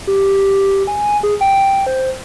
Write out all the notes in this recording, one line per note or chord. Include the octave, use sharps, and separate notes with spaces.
G4
G#5
G#4
G5
C5